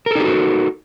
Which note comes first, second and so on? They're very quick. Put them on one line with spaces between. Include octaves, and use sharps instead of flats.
A#4 A4 D#4 G4 F#4